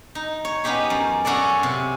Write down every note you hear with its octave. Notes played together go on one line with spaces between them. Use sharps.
D#4
C#5
B3 C#4 D#4 G4 G#4
F#2
C#4 F#4 G#4 A4 D5
C3